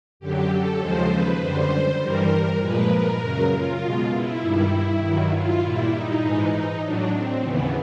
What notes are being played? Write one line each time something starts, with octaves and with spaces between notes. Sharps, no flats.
F#2 D3 F#3 G4
A4
D#2 C#3 F3 G#3 C5
B4
F#2 D3 G3 C5
G2 E3 G3 A#4
A#2 F3 G#3 B4
A#4
F#2 C#3 F#3
F4
B2 G#3
E4
G2 D#3 G3
G2 D#3 F#3
F4
A#2 G3 E4
D#4
G#2 E3 G#3
D#4
A2 F#3 D4
C4
D#2 C#3 E3 B3